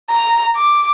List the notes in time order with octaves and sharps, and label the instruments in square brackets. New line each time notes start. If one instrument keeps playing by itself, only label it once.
[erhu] A#5
D6